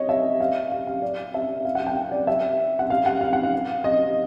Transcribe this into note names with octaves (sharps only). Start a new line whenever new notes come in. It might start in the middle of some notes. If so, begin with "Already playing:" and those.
Already playing: C#5 D#5
E5
F5
F5
F5
D5
E5
F5
F#5
G5
D5
E5
F#5
F5
F#5
F5
F#5
F5
D#5